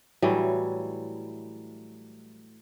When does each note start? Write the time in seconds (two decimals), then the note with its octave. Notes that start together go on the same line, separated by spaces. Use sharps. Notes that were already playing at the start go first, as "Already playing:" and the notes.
0.22 A2 E3 F#3 G3